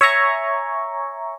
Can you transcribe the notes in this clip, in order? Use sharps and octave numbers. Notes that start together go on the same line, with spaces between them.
C#5 E5 G#5 A#5 C#6